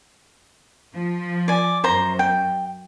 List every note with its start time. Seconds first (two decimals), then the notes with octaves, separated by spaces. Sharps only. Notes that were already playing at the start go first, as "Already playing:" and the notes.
0.94 F3
1.48 D5 G#5
1.84 F#2 C5 A#5
2.19 G5